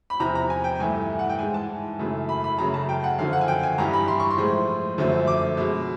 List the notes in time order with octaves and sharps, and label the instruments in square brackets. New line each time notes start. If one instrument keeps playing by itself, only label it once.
[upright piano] B5
E2 C3 F3 A#5
A#5
G#5
G5
G2 E3 A3 G#5
F#5
G5
G#2 E3 G#3 G#5
A5
F#2 C#3 E3 A3
B5
B5
F#2 C#3 F#3 A3 A#5
A5
G5
F#5
F#2 D3 F3 F5
F#5
G#5
G5
G#5
G2 E3 G3 A#5
B5
C6
C#6
C6
A2 F3 G#3
F#2 D3 F3 A3
D6
B2 G#3